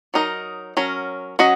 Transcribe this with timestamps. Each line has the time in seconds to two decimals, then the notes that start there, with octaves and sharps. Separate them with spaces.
0.14 F#3 D#4 A#4 D#5
0.77 F#3 C#4 A#4
1.39 F#3 C#4 F#4 D#5